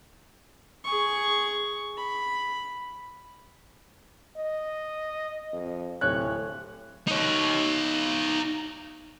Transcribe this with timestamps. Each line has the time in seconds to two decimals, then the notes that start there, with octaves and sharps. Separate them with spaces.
0.84 G#4 C#6
1.97 B5
4.37 D#5
5.53 F2
6.01 D1 C3 C#5 F#6
7.07 D#4 C#5